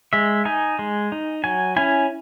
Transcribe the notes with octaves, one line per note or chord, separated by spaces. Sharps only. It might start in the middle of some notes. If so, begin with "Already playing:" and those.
G#3 E5
D#4 G#5
G#3
D#4
F#3 G#5
C#4 E4 G#5